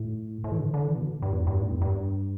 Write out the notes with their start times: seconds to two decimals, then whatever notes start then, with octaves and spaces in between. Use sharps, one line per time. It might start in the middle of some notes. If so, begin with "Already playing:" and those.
Already playing: A2
0.44 A2
0.52 E3
0.58 D3
0.74 D3
0.87 E3
0.97 B2
1.03 D3
1.22 G2
1.32 E2
1.47 G2
1.61 A2
1.72 E2
1.82 G2